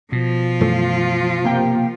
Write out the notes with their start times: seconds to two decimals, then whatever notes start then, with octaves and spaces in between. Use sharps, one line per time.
0.12 B2 F3 F4
0.61 F#2 E3 A3
1.43 C3 A#3 G5